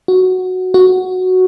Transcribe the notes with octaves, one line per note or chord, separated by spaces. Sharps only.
F#4
F#4